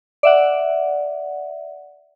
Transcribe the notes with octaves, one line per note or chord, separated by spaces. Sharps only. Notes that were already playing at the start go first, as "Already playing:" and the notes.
D5 E5 F#5